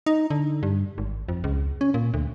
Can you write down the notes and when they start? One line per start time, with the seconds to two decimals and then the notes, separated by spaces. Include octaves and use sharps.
0.06 D#4
0.30 D3
0.63 G2
0.98 G#1
1.29 F2
1.44 C#2
1.81 C#4
1.94 A#2
2.14 D2